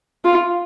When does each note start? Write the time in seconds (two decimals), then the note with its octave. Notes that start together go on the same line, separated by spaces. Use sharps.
0.25 F4